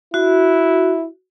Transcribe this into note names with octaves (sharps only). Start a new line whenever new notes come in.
E4 F#4